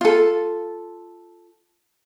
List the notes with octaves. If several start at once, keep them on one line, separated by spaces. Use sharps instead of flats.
F4 A4